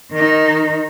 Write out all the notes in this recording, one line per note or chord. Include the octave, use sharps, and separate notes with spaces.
D#3 D#4